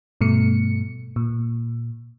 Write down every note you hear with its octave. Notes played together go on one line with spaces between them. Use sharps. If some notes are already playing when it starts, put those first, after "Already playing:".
G2 B2 A3 C#7
A#2